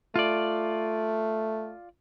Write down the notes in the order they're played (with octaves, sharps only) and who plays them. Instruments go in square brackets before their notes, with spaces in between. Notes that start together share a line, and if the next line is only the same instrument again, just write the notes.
[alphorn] A3 [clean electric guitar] F4 D5